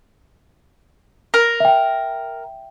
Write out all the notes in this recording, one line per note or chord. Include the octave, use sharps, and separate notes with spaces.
A#4
E5 G5